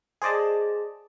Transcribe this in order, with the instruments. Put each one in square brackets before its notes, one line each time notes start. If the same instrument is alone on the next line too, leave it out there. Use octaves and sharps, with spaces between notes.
[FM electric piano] G#4 C5 D5 D#5 A5